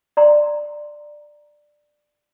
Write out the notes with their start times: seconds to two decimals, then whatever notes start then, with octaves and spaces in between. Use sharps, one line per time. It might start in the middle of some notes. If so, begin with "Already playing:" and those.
0.17 D5 A#5 C6